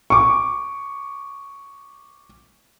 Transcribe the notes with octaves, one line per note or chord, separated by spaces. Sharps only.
C#6 D6